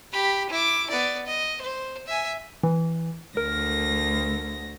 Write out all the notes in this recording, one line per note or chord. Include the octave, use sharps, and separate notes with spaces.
G4 B5
E4 D6
B3 D5
D#5
C5
E5 G#5
E3
D2 A#4 A#6